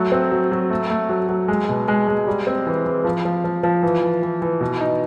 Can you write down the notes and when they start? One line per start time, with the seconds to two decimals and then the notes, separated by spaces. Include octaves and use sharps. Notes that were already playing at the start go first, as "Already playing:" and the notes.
Already playing: F#3 A3
0.12 C4
0.32 F#3
0.52 F#3
0.70 A3
0.90 A3
1.09 F#3
1.29 F#3
1.48 G#3
1.69 B2
1.88 G#3
2.08 G#3
2.27 G3
2.47 C4
2.67 E3
2.86 E3
3.04 F3
3.25 F3
3.44 F3
3.63 F3
3.83 E3
4.03 E3
4.23 E3
4.42 E3
4.61 B2
4.81 D#4